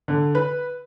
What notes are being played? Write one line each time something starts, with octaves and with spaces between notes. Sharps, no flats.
D3
B4